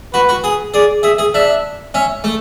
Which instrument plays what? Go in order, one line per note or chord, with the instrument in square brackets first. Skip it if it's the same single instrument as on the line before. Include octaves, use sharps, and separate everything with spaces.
[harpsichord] F#4 [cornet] B4
[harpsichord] F#4
G#4
[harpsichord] G#4 [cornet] D5
[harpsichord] G#4 [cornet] E5
[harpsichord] G#4
[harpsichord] D4 [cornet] E5
[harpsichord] C#4 [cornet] E5
[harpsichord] A3